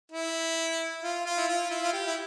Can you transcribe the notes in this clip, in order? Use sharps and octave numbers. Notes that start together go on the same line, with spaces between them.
E4
F4
F4
E4
F4
E4
F4
G4
E4